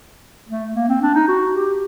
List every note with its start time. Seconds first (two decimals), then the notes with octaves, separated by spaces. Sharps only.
0.49 A3
0.76 A#3
0.88 C4
1.02 D4
1.14 D#4
1.28 F#4
1.54 G4